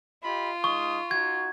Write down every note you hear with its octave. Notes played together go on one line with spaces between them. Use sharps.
F4 G4 D#5 B5
G#3 D#4 C#6 D#6
D#4 F#4 G#6